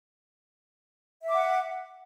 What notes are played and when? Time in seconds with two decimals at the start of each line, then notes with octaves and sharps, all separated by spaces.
1.23 E5
1.28 D6
1.33 F#5